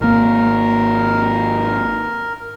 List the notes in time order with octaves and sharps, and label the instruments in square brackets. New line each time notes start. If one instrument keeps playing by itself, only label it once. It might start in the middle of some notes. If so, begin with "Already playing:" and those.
[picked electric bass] G#1 A#3 [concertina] A#4